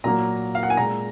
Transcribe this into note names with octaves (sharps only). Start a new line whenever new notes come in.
A#2 F#3 A#3 A#5
F5
F#5
G#5
A#2 G#3 A#5